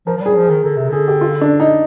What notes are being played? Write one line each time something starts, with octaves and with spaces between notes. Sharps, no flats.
F3 A#4
F3
G3
G#4
F3
G#4
D#3
D3 A#4
C3
D3 G#4
G4
F4
D4
D#4